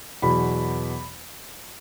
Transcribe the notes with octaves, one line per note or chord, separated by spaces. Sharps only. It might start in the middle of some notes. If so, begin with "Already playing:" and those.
E2 B2 F#3 B5